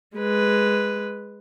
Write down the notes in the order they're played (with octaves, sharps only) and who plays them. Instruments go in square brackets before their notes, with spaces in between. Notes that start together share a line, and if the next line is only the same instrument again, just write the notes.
[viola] G#3 B4